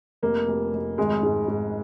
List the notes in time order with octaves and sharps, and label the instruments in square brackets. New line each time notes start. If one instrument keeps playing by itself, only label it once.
[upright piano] F1 A#3
F1
F1
G#1 G#3
G#2
G#2